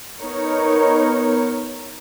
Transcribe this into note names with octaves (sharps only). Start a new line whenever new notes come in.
B3 D#4 A#4 C#5